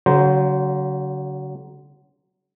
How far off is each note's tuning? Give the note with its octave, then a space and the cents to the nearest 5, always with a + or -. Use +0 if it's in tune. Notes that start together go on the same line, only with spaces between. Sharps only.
D3 -45 F#3 +15 C5 -10